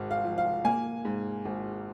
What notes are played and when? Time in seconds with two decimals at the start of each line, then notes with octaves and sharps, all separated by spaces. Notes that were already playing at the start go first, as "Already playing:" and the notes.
Already playing: G#1 G#2
0.11 F5
0.24 F3
0.38 F5
0.65 A#3 G#5
1.05 G#2
1.45 G#1